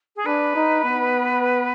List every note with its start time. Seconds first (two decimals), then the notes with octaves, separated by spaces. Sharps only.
0.16 G#4
0.26 D4 B4
0.55 D#4
0.84 B3